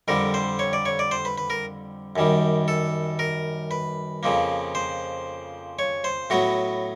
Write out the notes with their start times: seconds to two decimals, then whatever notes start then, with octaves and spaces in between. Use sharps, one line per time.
0.08 F2 D3 G3 A#4
0.34 C5
0.59 C#5
0.73 D5
0.86 C#5
0.99 D5
1.11 C5
1.25 B4
1.38 B4
1.50 A#4
2.16 F#2 D#3 G3
2.68 A4
3.19 A#4
3.71 B4
4.23 F2 C#3 F3 A#3
4.75 C5
5.79 C#5
6.04 C5
6.30 A2 F#3 B3 F#4